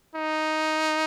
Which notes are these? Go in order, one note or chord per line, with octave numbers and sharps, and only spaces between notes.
D#4